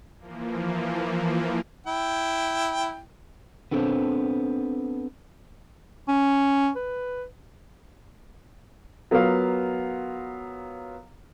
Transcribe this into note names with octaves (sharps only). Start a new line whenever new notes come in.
E3 F3 A#3
E4 G5
B3 C4 D4 A4 C5
C#4
B4
F#3 B3 F4 A#4 F5